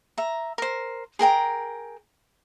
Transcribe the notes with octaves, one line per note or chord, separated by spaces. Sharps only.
E5 A#5
A#4 C5
G#4 A#4 G5 A#5